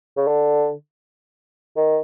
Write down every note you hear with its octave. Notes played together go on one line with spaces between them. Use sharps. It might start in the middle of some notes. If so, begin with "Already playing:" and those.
C#3
D3
D#3